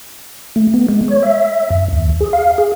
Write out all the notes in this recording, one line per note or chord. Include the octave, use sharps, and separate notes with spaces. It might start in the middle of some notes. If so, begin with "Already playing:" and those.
A3
B3
G#3
C#5
E5
F#2
D#2
G#4
F5
G#4